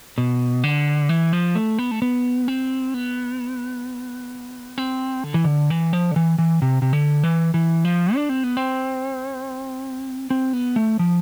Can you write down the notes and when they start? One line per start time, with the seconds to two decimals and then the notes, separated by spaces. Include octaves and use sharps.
0.18 B2
0.64 D3
1.09 E3
1.33 F3
1.55 A3
1.79 B3
1.91 A3
2.02 B3
2.48 C4
2.94 B3
4.78 C4
5.24 D3
5.34 E3
5.44 D3
5.70 E3
5.93 F3
6.11 D3
6.16 E3
6.38 E3
6.62 C3
6.82 C3
6.93 D3
7.23 E3
7.54 E3
7.85 F3
8.15 D4
8.29 C4
8.44 B3
8.57 C4
10.30 C4
10.53 B3
10.76 A3
10.99 F3